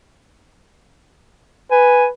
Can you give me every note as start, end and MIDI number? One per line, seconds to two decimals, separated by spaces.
1.71 2.10 71
1.71 2.05 80